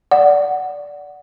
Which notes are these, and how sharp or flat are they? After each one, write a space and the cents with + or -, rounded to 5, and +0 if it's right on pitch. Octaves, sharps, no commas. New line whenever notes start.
D5 -10 F#5 +0